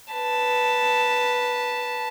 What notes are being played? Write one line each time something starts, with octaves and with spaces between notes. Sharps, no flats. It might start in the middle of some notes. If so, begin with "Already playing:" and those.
B4 A5